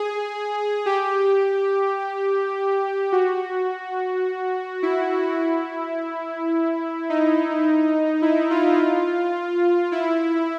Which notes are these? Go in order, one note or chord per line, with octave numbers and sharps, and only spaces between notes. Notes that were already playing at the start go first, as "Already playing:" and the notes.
Already playing: G#4
G4
F#4
E4
D#4
E4
F4
E4